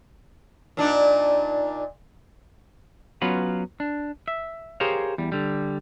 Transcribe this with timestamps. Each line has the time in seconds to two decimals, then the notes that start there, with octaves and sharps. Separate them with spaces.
0.77 A#2 D4 D#4
3.22 F#3 B3 C#4 F4 F#4 B4
3.80 D4
4.28 E5
4.80 G4 G#4 A#4 C5 C#5 F5
5.18 E2 G3
5.32 D3 G3